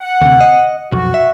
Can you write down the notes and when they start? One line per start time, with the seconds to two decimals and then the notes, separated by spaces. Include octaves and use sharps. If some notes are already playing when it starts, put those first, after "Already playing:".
0.01 F#5
0.22 D2 C3
0.41 D#5
0.92 B1 F2 F#4
1.14 E5